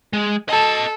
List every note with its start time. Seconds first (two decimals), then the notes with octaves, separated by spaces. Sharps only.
0.13 G#3
0.49 A4 D#5 A5